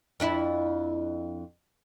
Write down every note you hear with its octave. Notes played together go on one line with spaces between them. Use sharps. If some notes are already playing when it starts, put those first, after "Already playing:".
F2 D4 E4